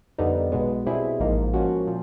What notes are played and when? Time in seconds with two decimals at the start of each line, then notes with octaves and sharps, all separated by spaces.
0.18 F2 D3 G3 B3 D#4
0.52 B1 B2 G#3 B3
0.86 B2 G3 C4 E4 G#4
1.20 A1 G#2 F3 A#3 D#4
1.54 G#2 F3 A#3 C#4 F#4
1.87 A#2 F3